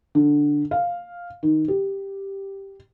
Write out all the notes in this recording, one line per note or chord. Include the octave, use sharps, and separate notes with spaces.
D3
F5
D#3
G4